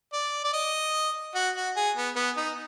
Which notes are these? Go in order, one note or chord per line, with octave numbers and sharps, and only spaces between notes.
D5
D5
D#5
F#4
F#4
G#4
B3
B3
D#4